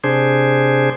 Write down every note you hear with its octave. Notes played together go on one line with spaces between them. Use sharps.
C3 D4 G#4 C5